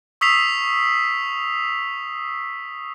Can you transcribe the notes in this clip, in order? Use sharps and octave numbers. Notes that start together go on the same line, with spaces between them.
C#6 D#6 E6 B6 C7 F7